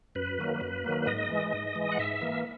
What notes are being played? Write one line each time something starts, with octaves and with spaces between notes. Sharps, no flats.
F#2 B4
D#3 F#3 A#3
F#2
D#3 F#3 A#3
G#2 D#5
E3 G#3
G#2
E3 G#3
F#5
G#2 E5
E3 A#3